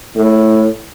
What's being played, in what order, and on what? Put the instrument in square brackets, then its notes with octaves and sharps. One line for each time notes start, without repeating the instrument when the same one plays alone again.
[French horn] A2